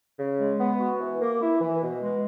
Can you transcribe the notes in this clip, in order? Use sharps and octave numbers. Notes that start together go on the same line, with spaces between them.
C#3
G#3
B3
F#4
E3
A#3
E4
E3
B2
G#3